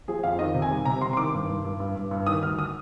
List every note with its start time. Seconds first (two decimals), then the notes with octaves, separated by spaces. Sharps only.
0.08 F3 G#4
0.24 F2 F5
0.39 D#3 D#5
0.55 C3
0.62 G#5
0.71 G3
0.85 C3 A#5
1.01 C3 C6
1.13 C6
1.17 D#3 D6
1.33 G2
1.48 G2
1.64 G2
1.80 G2
1.96 G2
2.11 G2
2.27 D#3 D#6
2.42 D2 F6
2.59 D#6